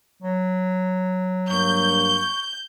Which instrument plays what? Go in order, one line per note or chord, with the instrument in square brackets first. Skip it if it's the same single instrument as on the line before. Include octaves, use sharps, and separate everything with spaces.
[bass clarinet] F#3
[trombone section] G2 A#3 [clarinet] C#6 [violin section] G6